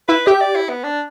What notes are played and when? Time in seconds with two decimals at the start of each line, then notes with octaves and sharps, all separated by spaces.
0.08 E4 B4
0.27 G4 E5
0.41 D5
0.56 E4
0.69 B3
0.84 D4